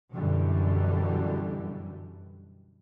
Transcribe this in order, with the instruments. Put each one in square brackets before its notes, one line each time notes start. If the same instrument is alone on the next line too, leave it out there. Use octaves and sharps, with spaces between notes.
[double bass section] F#2 B2 D3 E3 G3